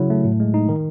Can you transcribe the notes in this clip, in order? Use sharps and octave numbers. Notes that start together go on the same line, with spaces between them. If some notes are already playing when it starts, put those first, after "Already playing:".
Already playing: C#3 F#3 E4
A3
A2
G#3
D#4
D#3